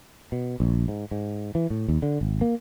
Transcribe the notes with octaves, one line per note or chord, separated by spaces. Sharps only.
B2
A#1
G#2
G#2
E3
A2
D#2
D3
G#1
A#3